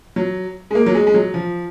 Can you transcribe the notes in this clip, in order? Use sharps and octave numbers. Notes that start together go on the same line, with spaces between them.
F#3
G#3
A#3
F#3
G#3
G#3
F#3
F3